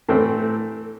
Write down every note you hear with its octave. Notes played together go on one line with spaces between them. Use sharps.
A2 E3 A3 C4